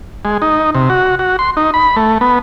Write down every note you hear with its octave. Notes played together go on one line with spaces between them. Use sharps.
G#3
D#4
C3
F#4
F#4
C6
D#4
B5
A3
B3